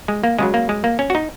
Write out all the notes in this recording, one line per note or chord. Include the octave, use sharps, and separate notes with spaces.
G#3
A#3
C#2 C#3 F#3 G#3
A#3
G#3
A#3
C#4
F#4
D#4